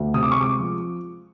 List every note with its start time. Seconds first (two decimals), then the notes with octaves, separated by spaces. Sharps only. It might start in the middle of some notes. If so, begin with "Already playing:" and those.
Already playing: D2
0.14 C3 D#6
0.23 D6
0.32 C#6
0.37 G#3 D6
0.59 F3